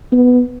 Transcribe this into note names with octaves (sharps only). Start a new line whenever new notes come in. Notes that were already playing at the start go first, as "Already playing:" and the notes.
B3